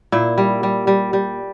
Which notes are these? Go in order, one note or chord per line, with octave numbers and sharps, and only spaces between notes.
A#2 E4
G3
G3
G3
G3